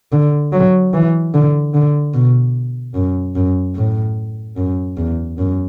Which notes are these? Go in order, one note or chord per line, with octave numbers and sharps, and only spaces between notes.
D3
F#3
E3
D3
D3
B2
F#2
F#2
A2
F#2
E2
F#2